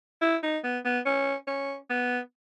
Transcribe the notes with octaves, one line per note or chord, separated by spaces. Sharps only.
E4
D#4
B3
B3
C#4
C#4
B3